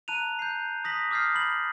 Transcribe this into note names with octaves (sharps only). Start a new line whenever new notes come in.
A5 A#5 F#6 D#7 F7
G6 C7
D#6 A#6 B6 F#7
D6 D#6 F6 G6 A6 C7
B5 A6 F#7